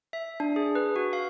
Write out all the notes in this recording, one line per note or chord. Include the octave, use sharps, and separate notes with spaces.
E5
D4
G#4
B4
F#4
F5